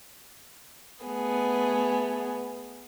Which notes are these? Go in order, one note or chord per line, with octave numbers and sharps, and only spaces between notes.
A3 B3 G#4